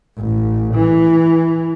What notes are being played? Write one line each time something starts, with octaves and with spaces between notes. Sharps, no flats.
A1
E3